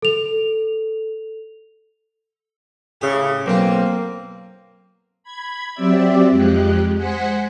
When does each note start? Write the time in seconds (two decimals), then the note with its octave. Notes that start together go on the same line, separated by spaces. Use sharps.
0.02 A4 F7
3.01 A2 C#3 G4
3.46 B1 A#3 C4 D4
5.23 B5 G#6
5.74 F#3 C4 G4 D5 E5
6.31 F2 F3 G#3 G4 F#6
6.96 G#3 C5 F#5 G#5 B6 C#7